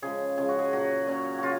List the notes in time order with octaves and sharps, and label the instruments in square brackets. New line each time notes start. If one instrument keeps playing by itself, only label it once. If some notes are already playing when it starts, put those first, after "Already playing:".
[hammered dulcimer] C#3 F3 G#3 G#4
C#3 F3 G#3 G#4
F#4
G#4
A#2 F#3 F#4
A#2 F#3 C#4
C#3 F4 F#4